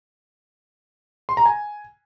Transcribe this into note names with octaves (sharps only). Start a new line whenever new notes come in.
C6
A#5
G#5